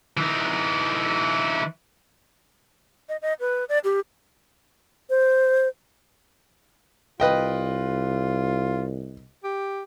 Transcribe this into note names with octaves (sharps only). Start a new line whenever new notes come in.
E3 D#4
D#5
D#5
B4
D5
G4
C5
C2 F4 B4 D#5 G5
G4